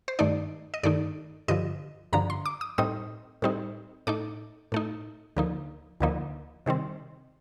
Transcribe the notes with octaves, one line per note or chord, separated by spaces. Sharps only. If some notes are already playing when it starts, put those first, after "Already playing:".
C5
G2 D#3 A3 D#4 D5
D#5
G2 D#3 A3 D#4 D5
G2 D3 F3 D#5
G2 D3 F3 A#5
C6
D6
D#6
A2 G3 C4 D#4 D#6
A2 G3 C4 D#4
A2 A3 D#4 D6
A2 A3 D#4
D2 D3 F3 A#3 D#4
D2 D3 F3 A#3 D#4
C3 D#3 G3 C4